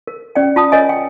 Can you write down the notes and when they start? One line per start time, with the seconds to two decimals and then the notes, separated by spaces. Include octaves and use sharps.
0.07 A#4
0.35 C#4 D5 G5
0.56 F4 A5 D#6
0.72 A#4 C#5 D#5 G#5
0.89 G5